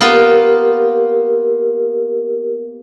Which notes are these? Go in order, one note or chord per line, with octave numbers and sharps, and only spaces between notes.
A#3 B3 F4 G4 A#4